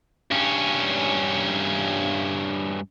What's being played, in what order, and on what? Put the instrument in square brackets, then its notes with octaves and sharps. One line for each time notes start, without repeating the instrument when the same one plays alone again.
[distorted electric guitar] G2 C#4